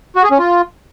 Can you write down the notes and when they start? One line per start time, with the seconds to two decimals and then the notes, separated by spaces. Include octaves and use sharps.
0.16 F#4
0.23 G#4
0.31 C#4
0.39 F4